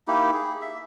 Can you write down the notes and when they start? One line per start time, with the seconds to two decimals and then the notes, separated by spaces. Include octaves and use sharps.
0.08 A#3 D#4 E4 G4
0.33 G#4
0.61 E5